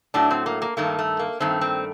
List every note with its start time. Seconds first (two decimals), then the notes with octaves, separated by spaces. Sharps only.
0.14 A2 F#3 A3 D4
0.31 C4
0.46 A#3
0.62 A#3
0.77 G2 D#3 A3 A#3
0.99 A3
1.19 A#3
1.40 G2 D#3 A3 C4
1.61 C4